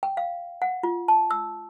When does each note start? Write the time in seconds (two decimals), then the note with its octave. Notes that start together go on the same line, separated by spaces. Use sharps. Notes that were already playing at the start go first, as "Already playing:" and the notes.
0.03 G5
0.17 F5
0.62 F#5
0.83 F4
1.08 A5
1.31 E6